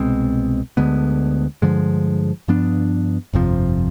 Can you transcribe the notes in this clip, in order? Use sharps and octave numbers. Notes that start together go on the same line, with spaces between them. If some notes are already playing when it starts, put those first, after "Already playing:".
Already playing: C2 B2 G#3 C4
D2 D3 G#3 B3
G2 D3 F3 G#3
G2 F3 B3 D4
G1 F2 C3 F3